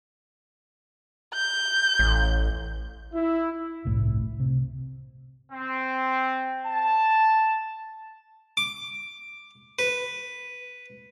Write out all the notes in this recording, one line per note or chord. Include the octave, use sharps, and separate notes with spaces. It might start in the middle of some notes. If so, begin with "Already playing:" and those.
G6
A1
E4
G1 C2 A2
C3
C4
A5
D6
B4